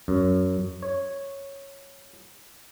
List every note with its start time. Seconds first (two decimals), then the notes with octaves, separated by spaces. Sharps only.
0.08 F#2
0.82 C#5